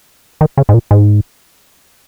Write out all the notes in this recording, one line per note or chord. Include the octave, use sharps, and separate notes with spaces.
D#3
C#3
G#2
A#2
G#2